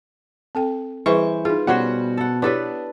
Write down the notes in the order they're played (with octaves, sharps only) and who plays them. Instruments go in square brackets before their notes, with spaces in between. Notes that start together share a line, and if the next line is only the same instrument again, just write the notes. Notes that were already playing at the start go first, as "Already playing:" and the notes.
[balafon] C4 A4 G5
[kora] E3 C5 [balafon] G3 G#4 [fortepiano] C#6
[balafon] D#4 G#4 [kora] F4
[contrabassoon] B2 [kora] G3 C#4 C5 [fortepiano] F#4 F#5
[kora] A4 F#5
[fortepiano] B3 [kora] D4 A4 B4 [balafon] E4 G4 C#5